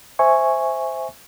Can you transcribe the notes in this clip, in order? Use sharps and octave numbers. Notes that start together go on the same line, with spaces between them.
C5 E5 G#5 C#6